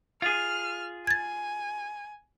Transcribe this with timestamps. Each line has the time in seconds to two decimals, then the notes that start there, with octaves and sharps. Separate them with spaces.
0.22 F4 G#4 F6
1.07 G#5 G#6 A6